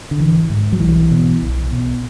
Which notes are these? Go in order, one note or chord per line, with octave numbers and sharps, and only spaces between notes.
D3
G#1 E3
G#2
F#3
B1 E3
B2
B1
B2